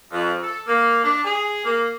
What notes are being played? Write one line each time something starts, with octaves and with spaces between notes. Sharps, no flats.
F2
A4
A#3
D4
G#4
A#3